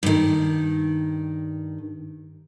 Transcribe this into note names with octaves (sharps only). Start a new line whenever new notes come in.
G2 D#3